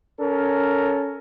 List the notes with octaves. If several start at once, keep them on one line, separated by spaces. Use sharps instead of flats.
C#4 A4 A#4